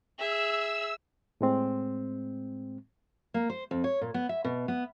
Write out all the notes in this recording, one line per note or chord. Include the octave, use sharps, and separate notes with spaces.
G#4 E5 E6
A2 G#3 C4
A#3
C5
F2
C#5
A#2
B3
E5
B2
B3